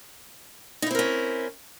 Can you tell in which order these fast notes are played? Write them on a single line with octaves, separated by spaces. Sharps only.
D#4 E4 C4 A#4 C#4